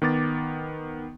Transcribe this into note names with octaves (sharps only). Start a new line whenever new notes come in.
D#3 B3 D6 A6